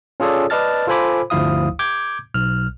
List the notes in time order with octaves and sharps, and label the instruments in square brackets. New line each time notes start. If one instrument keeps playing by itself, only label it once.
[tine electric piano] C#4 F4 G#4 A4 C#5 D5
B4 D5 D#5 A5 F6 A6
F4 A4 C5 G#5 B5 D6
G1 D2 F3 E4 F5 D#6
D6 G6 G#6
B1 F6